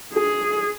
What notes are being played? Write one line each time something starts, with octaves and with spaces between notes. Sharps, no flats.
G#4